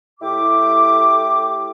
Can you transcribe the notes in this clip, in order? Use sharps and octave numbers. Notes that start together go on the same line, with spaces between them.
A2 E4 G4 G5 D6